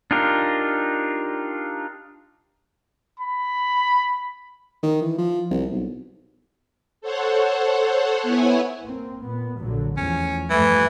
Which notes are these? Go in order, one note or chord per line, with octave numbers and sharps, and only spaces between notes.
D4 D#4 F4 G4 A#4
B5
D#3
E3
F3
C2
B1
A4 C5 C#5 F#5
B3 E4 C#5 F#5 G#5
A#3 C4
A#2 B3
A#1 D3 F#3
E2 F3 A3 C#4
G2 E3 F3 A3